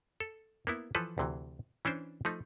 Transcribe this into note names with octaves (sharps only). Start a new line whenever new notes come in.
A4
A#3 B3 E4
E3 F3 A4 B4
D2 C3 E3
E3 C#4 D4 C5
F3 A3 D#4